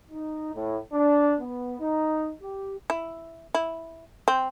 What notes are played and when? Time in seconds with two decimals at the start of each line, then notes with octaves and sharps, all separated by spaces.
0.11 D#4
0.55 A2
0.92 D4
1.40 B3
1.79 D#4
2.42 G4
2.90 E4
3.55 E4
4.28 C4